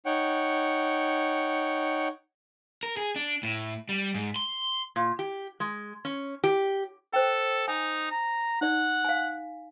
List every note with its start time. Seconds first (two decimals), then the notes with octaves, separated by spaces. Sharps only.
0.06 D#4 C#5 F#5 G5
2.83 A#4
2.97 G#4
3.16 D4
3.43 A2
3.89 G3
4.15 G#2
4.36 C6
4.96 A#2
5.19 G4
5.60 G#3
6.05 C#4
6.44 G4
7.13 A4 C5 G5
7.68 D#4 G#5
8.11 A#5
8.61 D#4 D5 F#5
9.05 F5 G#5